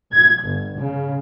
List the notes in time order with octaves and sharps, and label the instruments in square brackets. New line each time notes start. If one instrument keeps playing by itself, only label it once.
[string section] G#6
G1
C#3